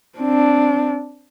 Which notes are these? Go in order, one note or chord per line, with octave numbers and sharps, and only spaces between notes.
C4 D4